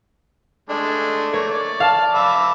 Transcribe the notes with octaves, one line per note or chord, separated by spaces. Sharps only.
G#3 A3 D4
A3 A#3 C#5
D5
F5 A5
E5 B5 D6